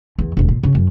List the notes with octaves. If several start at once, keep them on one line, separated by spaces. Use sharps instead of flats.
E2
E1 D2
A#2
C#3
F#2